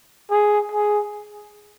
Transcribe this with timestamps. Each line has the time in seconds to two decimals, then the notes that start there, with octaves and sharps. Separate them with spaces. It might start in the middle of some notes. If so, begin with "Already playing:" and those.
0.30 G#4
0.72 G#4